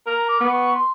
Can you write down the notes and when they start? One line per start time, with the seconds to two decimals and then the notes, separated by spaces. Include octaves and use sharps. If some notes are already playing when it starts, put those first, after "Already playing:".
0.07 A#4 A#5
0.29 D6
0.40 B3
0.53 C#6
0.75 C6